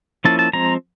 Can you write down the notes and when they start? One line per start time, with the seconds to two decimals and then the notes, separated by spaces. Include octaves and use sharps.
0.25 F3 A#3 C#4 E4 A5
0.39 A5
0.53 F3 G#3 C4 A#5